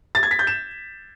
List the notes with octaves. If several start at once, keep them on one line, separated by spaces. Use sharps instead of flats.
A6
G#6
B6
G6
E7